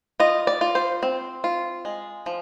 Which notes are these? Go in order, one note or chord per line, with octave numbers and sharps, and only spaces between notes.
F4 D#5
D5
F4
C5
C4
F4
G#3
F3